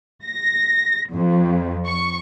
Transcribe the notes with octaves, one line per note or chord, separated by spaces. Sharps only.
A#6
F2
C#6